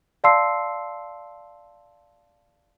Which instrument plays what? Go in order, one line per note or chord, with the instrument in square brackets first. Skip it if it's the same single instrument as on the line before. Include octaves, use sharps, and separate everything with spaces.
[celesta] D5 F5 A5 C6 E6 C7